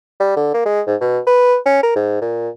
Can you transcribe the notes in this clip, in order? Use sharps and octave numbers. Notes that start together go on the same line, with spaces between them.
G3
D3
A#3
G#3
G#2
B2
B4
C#4
A#4
G#2
A#2